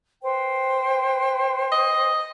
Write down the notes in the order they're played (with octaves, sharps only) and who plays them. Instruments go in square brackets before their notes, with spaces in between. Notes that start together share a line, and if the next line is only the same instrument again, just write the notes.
[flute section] B4 C5 G5
[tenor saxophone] D#5